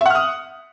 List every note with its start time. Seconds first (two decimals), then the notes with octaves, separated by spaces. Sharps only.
0.01 E5
0.06 F#5
0.10 F6
0.15 D#6